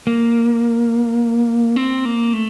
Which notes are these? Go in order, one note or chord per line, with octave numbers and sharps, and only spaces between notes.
A#3
C4
A#3
A3